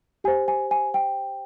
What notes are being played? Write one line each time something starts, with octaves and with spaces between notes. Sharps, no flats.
G4 C5 G#5
G#5
G#5
G5